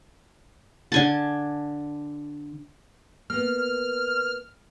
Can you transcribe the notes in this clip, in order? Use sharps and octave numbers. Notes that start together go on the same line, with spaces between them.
D3 G#5 A5
A#3 B3 F6